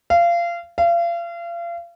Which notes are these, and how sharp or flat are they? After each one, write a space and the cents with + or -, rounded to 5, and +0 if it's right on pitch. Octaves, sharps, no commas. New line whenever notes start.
F5 -25
F5 -35